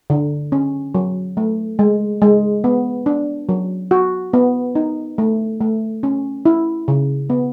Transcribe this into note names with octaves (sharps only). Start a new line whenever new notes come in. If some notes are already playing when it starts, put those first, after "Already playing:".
D3
C#4
F#3
A3
G#3
G#3
B3
D4
F#3
F#4
B3
D#4
A3
A3
C#4
E4
C#3
B3